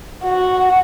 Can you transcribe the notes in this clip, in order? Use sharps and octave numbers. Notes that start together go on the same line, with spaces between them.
F#4